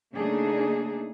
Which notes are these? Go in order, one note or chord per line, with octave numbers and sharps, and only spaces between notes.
C#3 A3 A#3 D4 D#4 G#4